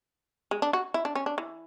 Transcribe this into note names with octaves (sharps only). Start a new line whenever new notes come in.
G#3
D4
F#4
E4
D4
C#4
D4
E3